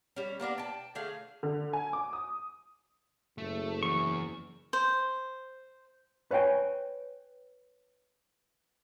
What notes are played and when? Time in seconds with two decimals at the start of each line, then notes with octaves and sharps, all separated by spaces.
0.16 G3 C#4
0.40 A#3 B3 D4 A#4
0.58 G5 A5
0.95 D3 A3 G#4 F5
1.43 D3
1.73 G#5
1.93 D6
2.13 D#6
3.38 F#1 A3
3.83 E2 C#6
4.73 C5
6.31 B4 C#5 F5 G5 G#5